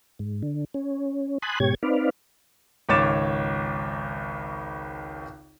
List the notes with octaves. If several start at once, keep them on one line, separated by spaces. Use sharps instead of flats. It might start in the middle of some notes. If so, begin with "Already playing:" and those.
G#2
D3
C#4
G#5 A5 B5 C6 D#6 F#6
G#2 B2 G4 C#5 G#6
C4 D#4 B4 D5 F5
G#1 C#2 C#5 D6 A6 E7